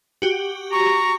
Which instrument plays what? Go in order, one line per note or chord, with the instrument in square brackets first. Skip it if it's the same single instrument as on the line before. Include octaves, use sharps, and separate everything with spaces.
[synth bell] F#4 G4
[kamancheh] A#5 [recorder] C#6